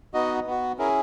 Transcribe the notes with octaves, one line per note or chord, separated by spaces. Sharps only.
B3 D#4 F#4 D#5
B3 F#4
C#4 E4 G#4 A#4